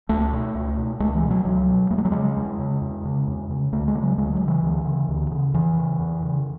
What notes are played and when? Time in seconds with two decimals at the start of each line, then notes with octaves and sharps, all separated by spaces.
0.09 C#2 A3
0.32 B2
0.55 C#2
0.77 B2
1.00 C#2 G#3
1.15 E3
1.23 B2
1.31 F#3
1.45 C#2 F#3
1.68 B2
1.90 E2 A3
1.98 G#3
2.05 F#3
2.12 C#3 G#3
2.37 E2
2.59 C#3
2.81 E2
3.05 C#3
3.27 E2
3.50 C#3
3.73 D2 A3
3.88 G#3
3.95 C#3
4.03 F#3
4.18 D2 G#3
4.33 F#3
4.41 C#3
4.48 E3
4.63 D2
4.86 C#3
5.08 D2
5.32 C#3
5.54 E2 E3
5.77 C#3
5.99 E2
6.22 C#3